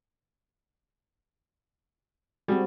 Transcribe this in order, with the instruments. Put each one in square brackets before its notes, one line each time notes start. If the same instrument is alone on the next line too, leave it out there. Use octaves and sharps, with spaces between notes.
[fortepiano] G3 G#4 [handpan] C4 F#4